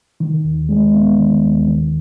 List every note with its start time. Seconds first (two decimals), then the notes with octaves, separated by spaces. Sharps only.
0.20 D#3
0.44 D#2
0.69 G#3
0.94 B3
1.19 D#3
1.44 D#2
1.68 D#3